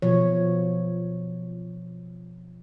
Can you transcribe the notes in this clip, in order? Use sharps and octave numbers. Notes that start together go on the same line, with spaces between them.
B2 F3 C#5